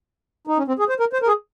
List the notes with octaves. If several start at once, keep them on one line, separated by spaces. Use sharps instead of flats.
D#4
C#4
C4
G#4
C5
A#4
C5
A#4
G#4